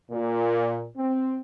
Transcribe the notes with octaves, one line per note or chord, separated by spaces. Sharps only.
A#2
C4